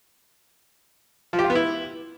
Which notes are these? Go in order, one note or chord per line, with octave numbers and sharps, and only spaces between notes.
F3
G4
F4
B3
E4